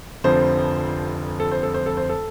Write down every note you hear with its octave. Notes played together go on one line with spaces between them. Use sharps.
F1 F2 D3 F3 C5
A4
C5
A4
C5
A4
C5
A4